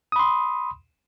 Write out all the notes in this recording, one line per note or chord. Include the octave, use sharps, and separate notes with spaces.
B5 C6 D#6